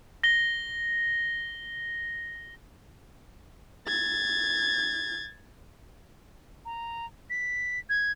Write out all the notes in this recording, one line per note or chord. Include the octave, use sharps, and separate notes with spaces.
A#6 G7
G#6 A6
A#5
B6
G#6